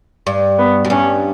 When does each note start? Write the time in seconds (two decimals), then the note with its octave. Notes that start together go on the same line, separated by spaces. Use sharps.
0.27 G2
0.59 B3
0.85 F#2
0.90 G2 C#4